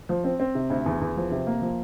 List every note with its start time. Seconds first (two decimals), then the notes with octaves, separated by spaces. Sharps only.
0.09 F3
0.24 C4
0.40 C4
0.55 C3
0.70 D2
0.86 E2
1.01 E2
1.17 F3
1.31 C3
1.47 A#3
1.62 F3